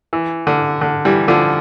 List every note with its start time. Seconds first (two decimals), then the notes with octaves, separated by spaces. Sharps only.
0.13 E3
0.47 D3
0.81 D3
1.05 E3 G3
1.28 D3 F3